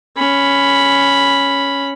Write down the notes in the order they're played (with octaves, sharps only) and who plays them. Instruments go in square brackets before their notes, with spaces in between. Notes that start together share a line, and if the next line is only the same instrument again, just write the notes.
[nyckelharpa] C#4 B5